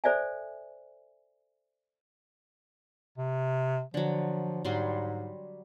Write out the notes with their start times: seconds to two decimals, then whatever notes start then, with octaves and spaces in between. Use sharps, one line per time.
0.04 A4 C5 D5 E5 G#5
3.18 C3
3.94 D3 F3 F#3
4.65 G#2 F#3 G3 C6